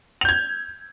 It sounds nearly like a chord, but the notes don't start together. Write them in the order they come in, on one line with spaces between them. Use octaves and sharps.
F7 G6 G#6